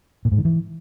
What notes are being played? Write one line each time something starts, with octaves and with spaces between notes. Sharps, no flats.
A#2
G#2
D#3
E3